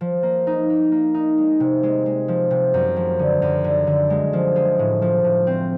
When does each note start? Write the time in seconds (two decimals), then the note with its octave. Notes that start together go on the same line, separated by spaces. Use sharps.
0.01 F3
0.23 A#3
0.47 D#4
0.70 A#3
0.92 A#3
1.14 D#4
1.38 G#3
1.60 C3
1.83 G#3
2.06 G#3
2.28 F3
2.51 C3
2.74 F#2
2.96 F3
3.19 D3
3.42 F#2
3.64 D3
3.87 D3
4.10 G#3
4.33 F3
4.56 G#3
4.79 A2
5.02 F3
5.24 A2
5.47 C4